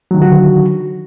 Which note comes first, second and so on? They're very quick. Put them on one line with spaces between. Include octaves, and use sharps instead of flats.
F#3 D#3 D3 F#4